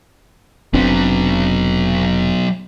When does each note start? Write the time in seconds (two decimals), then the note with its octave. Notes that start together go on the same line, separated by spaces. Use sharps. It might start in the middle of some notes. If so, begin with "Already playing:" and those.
0.74 F1 F#3 B3 C4 D4